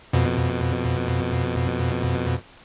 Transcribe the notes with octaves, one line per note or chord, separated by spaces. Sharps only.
F2 B2